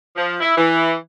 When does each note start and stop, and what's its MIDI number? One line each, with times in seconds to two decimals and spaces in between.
0.16 0.36 53
0.41 0.53 64
0.57 0.94 52